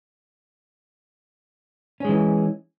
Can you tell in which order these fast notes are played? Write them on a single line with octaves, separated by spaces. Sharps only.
C#4 G#3 E3